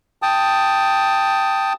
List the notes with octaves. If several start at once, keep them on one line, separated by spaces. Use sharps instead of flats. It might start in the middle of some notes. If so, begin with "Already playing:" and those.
G5 A5 D#6